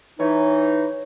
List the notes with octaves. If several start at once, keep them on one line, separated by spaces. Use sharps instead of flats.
E3 D#4 C#5